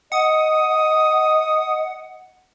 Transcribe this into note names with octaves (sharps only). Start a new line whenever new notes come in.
D#5 F#5 D#6